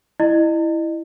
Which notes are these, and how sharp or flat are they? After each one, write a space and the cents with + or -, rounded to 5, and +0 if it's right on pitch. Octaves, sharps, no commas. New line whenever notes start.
E4 +0 D#5 -35